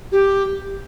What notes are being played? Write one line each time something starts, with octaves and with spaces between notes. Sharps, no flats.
G4